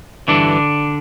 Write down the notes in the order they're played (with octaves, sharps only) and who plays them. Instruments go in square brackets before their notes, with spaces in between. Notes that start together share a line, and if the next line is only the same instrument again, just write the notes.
[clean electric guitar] G2 D3 E3 D4